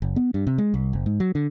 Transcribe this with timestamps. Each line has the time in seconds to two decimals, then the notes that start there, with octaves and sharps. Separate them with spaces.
0.02 F#1
0.16 B3
0.34 G2
0.47 C3
0.58 G#3
0.74 C2
0.93 F#1
1.06 G#2
1.20 F#3
1.35 D3